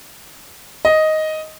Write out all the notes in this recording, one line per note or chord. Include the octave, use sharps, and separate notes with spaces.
D#5